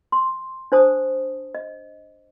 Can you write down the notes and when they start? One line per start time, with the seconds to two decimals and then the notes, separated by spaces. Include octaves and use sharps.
0.12 C6
0.72 D4 C5 A5 D#6
1.55 D#5